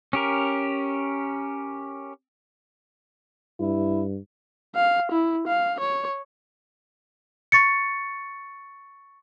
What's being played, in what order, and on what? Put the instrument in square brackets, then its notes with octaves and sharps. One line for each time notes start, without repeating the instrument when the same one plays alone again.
[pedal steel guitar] C#4 G4 A#4
[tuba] G2 [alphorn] E4
[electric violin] F5
E4
F5
C#5
[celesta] C#6 A6 C#7